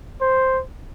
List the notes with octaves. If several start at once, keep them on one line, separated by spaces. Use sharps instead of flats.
C5